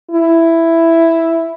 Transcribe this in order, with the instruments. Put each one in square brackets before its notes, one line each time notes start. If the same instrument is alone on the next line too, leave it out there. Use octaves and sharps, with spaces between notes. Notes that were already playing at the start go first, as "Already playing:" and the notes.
[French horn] E4